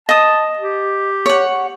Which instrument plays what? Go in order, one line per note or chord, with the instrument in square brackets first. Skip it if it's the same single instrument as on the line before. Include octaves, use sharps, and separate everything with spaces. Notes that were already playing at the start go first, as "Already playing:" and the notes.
[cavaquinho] D#5 D#6 [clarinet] A5
[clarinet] G4
[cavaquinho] C#5 F#5